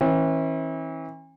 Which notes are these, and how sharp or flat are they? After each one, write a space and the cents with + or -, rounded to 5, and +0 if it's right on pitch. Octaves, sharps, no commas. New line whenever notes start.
E3 -30 C#4 -45